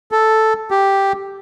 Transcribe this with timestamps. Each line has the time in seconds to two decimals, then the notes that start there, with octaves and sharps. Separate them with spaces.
0.12 A4
0.71 G4